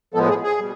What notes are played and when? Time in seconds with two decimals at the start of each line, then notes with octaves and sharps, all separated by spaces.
0.14 A2 F3 G#3 B3 A4
0.29 G#4
0.43 G#4
0.58 B2 G3